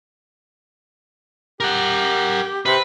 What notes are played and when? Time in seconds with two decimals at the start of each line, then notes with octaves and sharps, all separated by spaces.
1.60 G4 A#4 F#5
2.66 C3 B4